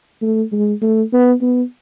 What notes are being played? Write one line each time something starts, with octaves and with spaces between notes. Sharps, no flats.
A3
G#3
A3
B3
B3